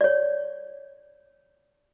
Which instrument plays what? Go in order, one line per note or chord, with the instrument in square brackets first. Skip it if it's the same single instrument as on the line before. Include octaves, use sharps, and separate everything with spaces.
[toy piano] C#5 D5